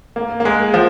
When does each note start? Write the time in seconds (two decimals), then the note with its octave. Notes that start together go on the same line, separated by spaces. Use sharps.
0.16 A#3
0.40 A#3
0.45 G#3
0.74 F3